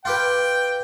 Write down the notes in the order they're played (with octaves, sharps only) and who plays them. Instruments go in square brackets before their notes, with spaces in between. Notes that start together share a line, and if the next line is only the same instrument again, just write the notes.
[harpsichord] F4 G4 B4 [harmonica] G5